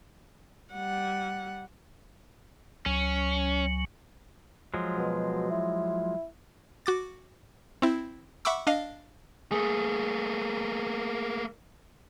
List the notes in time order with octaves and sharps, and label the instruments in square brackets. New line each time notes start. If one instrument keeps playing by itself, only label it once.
[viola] G3 F#5
[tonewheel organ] C#2 F#3 [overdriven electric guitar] C#4
[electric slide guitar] F3 F#3 G#3
[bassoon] B2
E4
[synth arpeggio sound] F#4 D6 A6
C4 E4
E5 F#5 B5 C#6 D6 E6
D4 D#5 F5
[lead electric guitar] A3 A#3 [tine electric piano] G#4